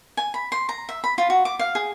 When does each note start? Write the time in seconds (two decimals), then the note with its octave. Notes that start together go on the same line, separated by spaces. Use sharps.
0.17 G#5
0.34 B5
0.52 C6
0.69 A#5
0.89 E5
1.04 B5
1.18 F4
1.30 F#4
1.45 D6
1.59 F5
1.75 G#4